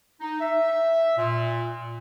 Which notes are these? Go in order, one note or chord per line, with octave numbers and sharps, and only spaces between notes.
D#4
E5
A#2